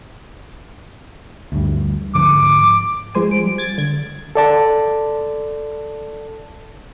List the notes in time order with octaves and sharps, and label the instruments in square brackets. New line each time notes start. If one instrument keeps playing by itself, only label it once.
[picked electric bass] D2 G2
[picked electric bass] G#2 D3 F3 [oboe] D6
[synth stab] F3 G#3 C5 G#5
D7
G3
G#6 A6 D7
D3 G#6
[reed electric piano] A4 D5 A5